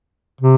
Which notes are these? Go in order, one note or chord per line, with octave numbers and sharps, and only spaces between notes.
C3